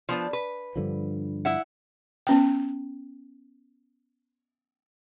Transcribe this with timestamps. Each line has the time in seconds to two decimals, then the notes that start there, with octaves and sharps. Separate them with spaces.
0.09 F3 B3 D4
0.33 B4
0.76 G2 D3 F3
1.45 E4 E5 F#5
2.27 B3 C#4 G5